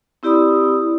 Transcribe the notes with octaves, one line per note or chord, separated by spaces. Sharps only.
C4 E4 G4 D5 B5 D#6